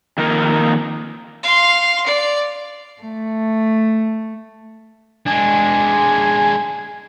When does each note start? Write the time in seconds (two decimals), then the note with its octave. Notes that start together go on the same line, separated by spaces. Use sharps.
0.18 F2 D#3 A#3 A#4
1.43 F5 C6
2.07 D5
3.02 A3
5.27 G#3 D4 G#5